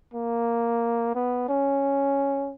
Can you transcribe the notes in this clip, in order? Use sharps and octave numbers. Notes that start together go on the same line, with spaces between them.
A#3
B3
C#4